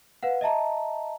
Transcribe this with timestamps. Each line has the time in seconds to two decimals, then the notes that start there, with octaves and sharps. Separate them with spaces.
0.23 B4 F5 F#5
0.41 D#5 E5 A5 A#5